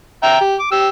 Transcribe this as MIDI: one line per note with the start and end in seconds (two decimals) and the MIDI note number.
0.23 0.38 76
0.23 0.38 79
0.23 0.38 82
0.41 0.56 67
0.59 0.67 86
0.72 0.88 67
0.72 0.88 88